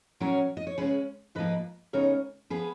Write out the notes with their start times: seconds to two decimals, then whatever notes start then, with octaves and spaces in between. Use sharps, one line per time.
0.20 A#2 F#3 C#4 A#4 C#5
0.57 D#5
0.67 C#5
0.78 C#3 G#3 C#4 G#4 B4
1.35 G#2 F3 A#3 B4 D#5
1.93 C#3 G#3 B3 D#4 A#4 C#5
2.50 F3 B3 G#4 B4